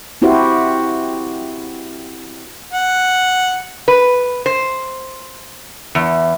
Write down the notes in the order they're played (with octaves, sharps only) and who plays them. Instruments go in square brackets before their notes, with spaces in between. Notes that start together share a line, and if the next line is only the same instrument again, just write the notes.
[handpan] C4 E4 F#4 G4 C5
[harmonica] F#5
[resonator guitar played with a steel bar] B4
C5
E2